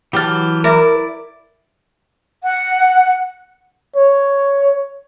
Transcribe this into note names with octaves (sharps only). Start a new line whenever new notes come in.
E3 F#3 G4 A5 F6
E4 A#4 D5
F#5
C#5